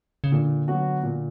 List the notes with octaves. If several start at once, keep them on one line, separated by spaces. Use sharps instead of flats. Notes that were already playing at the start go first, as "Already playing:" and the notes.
C#3
A#2 D3
F#3 B3 F#4
A#2